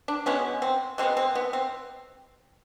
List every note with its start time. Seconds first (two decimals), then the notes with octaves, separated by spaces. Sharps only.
0.08 D4
0.26 B2 G#3 B3 C#4
0.62 C4
0.98 B2 G#3 B3 C4
1.17 C4
1.35 B3
1.53 C4